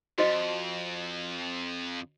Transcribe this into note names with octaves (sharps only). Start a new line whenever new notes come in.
F2 F#4 C5 D#5